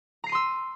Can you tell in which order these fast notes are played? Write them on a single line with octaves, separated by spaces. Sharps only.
A#5 C7 D#7 C6 E6